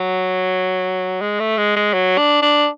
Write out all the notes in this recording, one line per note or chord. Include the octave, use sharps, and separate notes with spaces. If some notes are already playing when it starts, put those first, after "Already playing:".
Already playing: F#3
G#3
A3
G#3
G#3
F#3
D4
D4